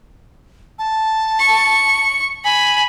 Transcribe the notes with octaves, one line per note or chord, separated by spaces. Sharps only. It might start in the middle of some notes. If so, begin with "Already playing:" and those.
A5
C#6
G#5 B5